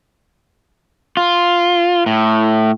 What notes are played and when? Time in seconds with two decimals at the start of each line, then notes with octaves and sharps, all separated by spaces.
1.17 F4
2.06 A2